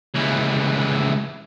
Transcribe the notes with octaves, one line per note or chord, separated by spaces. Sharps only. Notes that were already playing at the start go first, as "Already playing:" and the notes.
C#2 E3